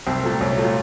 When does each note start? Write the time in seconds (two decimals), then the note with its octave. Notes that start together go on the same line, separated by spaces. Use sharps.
0.07 C2 C4
0.23 A#2 A3
0.41 C2 C#4
0.57 A#2 A3
0.64 F4